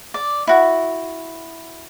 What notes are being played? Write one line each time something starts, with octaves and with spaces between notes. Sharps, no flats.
D5
E4 F#4